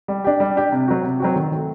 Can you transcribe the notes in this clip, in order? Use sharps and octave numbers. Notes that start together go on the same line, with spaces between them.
G3
D4 G4
G3
D4 G4
C3
F#3 C4 F#4
C3
F#3 C4 F#4
D#3
A3 C4